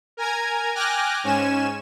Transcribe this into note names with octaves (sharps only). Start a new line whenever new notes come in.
A#4 G#5 A#5 G#6
G5 G#5 D6 F6 F#6 A#6
G#2 C#4 G#5 E7